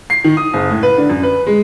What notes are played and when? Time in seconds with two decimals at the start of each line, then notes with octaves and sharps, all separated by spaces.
0.10 C7
0.24 D#3
0.37 D#6
0.53 F#1
0.70 A2
0.83 B4
0.98 D3
1.09 F#2
1.23 B4
1.47 G#3